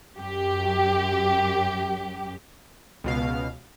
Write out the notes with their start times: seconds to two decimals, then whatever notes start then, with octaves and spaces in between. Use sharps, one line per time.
0.18 F#2 G4
3.04 C#2 B2 F5